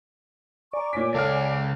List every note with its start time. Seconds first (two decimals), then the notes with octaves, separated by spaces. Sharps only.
0.73 D5 G#5 A#5 C#6
0.93 A#2 C#5 G#5 B6
1.14 C#2 A4 F5 F6